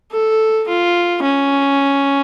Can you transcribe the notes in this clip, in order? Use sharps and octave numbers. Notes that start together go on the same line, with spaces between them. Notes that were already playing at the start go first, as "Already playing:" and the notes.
A4
F4
C#4